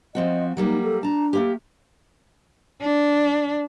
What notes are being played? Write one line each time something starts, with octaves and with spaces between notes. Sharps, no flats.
F3 C4 F#4 D#5
F#3 G3 A#3 D#4
A4
D4 A5 A#5
A3 A#3 G4
D4